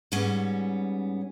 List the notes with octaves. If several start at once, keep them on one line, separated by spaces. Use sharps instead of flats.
G#2 G3 B3 C#4